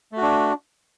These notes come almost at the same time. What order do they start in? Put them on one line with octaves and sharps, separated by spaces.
A3 F#4 D4